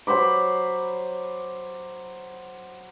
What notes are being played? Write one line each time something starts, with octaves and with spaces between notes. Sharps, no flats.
F#3 C5 B5 D6